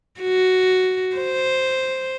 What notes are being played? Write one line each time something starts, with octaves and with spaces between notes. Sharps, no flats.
F#4
C5